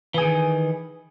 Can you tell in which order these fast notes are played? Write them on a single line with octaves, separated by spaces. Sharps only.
E3 G#4 D#3